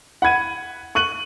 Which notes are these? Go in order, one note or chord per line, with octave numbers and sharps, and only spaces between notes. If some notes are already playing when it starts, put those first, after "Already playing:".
F#5 B5 G#6 D#7
C#6 F#6 D#7 F#7